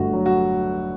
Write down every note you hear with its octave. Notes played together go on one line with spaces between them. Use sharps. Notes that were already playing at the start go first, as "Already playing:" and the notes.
Already playing: G1 G2 A3 F#4
F#3
F#4